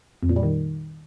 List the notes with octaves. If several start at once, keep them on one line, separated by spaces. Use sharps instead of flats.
F2
A#2
G3
D#3